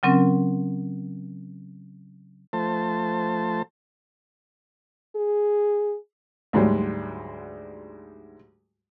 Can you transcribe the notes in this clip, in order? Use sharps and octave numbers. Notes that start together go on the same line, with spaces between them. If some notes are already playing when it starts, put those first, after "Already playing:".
C#3 F#3 C4 C#4 A#4
F3 A3 C5 A5
G#4
D2 G#2 F#3 G3